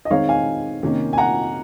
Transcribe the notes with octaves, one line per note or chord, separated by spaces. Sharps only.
D#5
D#3 G#3 C4 D#4 C#5 F5
F5 G#5
C3 D#3 A#3 C#4
G#5
F#5 A#5